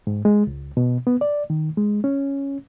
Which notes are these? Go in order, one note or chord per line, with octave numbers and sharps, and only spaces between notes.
G#2
G#3
C#2
B2
B3
D5
D#3
G#3
C#4